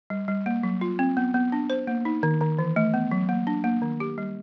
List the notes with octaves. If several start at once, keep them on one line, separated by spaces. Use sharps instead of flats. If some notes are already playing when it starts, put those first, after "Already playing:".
G3
G3
A#3
F#3
F4
C4
B3
B3
D4
C5
A#3
D#4
D#3
D#3
E3
A3
B3
F#3
A#3
D4
A#3
D#3
G4
G3